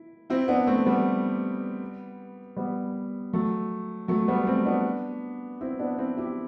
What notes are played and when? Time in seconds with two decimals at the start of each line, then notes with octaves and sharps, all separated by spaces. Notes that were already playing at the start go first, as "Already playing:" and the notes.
Already playing: E4
0.30 C4 E4
0.48 B3 D4
0.67 A3 C4
0.86 G3 B3
2.57 G3 B3
3.33 F#3 A3
4.08 F#3 A3
4.28 G3 B3
4.47 A3 C4
4.66 B3 D4
5.61 C4 E4
5.79 B3 D4
5.98 C4 E4
6.17 E4 G4